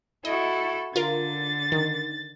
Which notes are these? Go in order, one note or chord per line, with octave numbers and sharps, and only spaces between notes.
E4 F#4 A4 D#5
D3 F4 A#4 A6
D#3